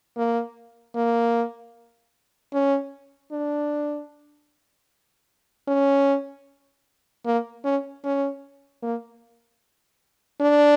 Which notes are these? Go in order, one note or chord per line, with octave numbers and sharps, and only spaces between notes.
A#3
A#3
C#4
D4
C#4
A#3
C#4
C#4
A#3
D4